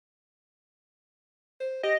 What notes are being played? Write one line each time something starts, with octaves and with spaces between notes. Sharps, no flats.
C5
G4 D#5